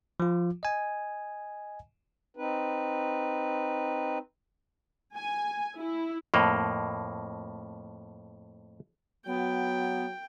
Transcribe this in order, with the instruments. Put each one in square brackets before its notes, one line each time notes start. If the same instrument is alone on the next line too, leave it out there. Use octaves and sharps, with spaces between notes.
[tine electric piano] F3 F4
D#5 G#5
[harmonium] C4 D#4 B4
[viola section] G#5
E4
[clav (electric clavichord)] F2 A2 A#3
[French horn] F#3 [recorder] B3 [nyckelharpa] G5